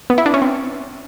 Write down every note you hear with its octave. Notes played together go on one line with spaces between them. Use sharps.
B3
E4
D4
C#4
C4